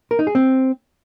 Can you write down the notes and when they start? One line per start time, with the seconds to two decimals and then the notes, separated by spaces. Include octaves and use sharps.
0.11 A#4
0.19 D#4
0.27 G#4
0.35 C4